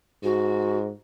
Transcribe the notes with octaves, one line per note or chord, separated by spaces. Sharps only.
G#2 F#4